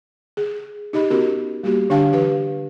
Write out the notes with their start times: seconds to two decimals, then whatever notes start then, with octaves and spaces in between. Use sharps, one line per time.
0.37 G#4
0.93 D#4 G4 D#5 B5
1.10 B3 C#4 F#4 G4 A#4
1.63 G3 A#3 F#4 G4
1.90 D3 D4 G4 F5 G5 A5
2.12 E3 G4 B4